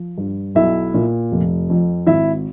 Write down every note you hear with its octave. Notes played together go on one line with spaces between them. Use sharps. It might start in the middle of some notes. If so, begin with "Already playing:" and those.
Already playing: F3
G2
B1 E4 E5
A#2
F1
F2
G#1 E4 E5